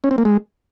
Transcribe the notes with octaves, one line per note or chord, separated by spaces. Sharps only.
C#4
C4
A#3
G#3